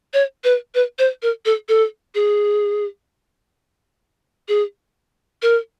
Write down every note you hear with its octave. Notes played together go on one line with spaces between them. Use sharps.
C#5
B4
B4
C5
A#4
A4
A4
G#4
G#4
A#4